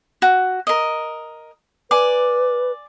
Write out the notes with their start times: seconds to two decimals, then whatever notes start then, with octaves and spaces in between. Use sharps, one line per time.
0.22 F#4
0.67 A#4 D#5
1.91 B4 D5 G#5 D6